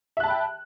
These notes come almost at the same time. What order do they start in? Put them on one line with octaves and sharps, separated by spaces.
E5 F#6 A5 B5 G5